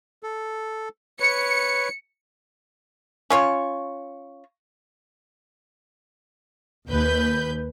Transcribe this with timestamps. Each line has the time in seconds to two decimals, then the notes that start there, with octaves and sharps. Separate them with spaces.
0.23 A4
1.20 B4 C#5 C#7
3.30 C#4 F4 C#5
6.89 D#2 B4 G6